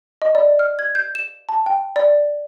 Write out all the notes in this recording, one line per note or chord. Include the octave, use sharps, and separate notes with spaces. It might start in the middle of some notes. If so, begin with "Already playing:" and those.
D#5
D5
F6
G#6
G6
E7
A5
G5
D5